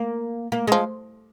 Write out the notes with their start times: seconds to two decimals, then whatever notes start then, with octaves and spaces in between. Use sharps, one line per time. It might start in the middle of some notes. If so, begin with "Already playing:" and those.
Already playing: A#3
0.52 A#3
0.67 F3 G#3